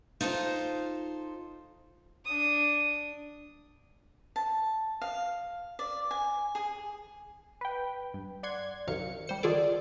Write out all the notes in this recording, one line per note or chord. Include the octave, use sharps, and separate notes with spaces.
D#4 F4 A4 C5
D4 D#6
A5
F5
D5
G#5
G#4
B4 G5
G2
D5 F#5 C6 G#6
C2 F#2 D#3 F5 C#7
G3 C5 C#7
D3 D#3 F4 G#4 A4 D5